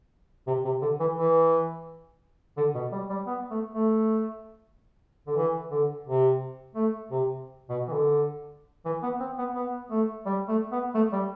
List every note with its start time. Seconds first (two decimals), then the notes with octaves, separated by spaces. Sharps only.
0.47 C3
0.65 C3
0.82 D3
1.00 E3
1.18 E3
2.57 D3
2.75 B2
2.92 G3
3.10 G3
3.27 B3
3.51 A3
3.74 A3
5.27 D3
5.37 E3
5.71 D3
6.07 C3
6.76 A3
7.12 C3
7.70 B2
7.88 E3
7.93 D3
8.86 E3
9.03 B3
9.20 C4
9.39 B3
9.56 B3
9.91 A3
10.26 G3
10.49 A3
10.72 B3
10.95 A3
11.13 G3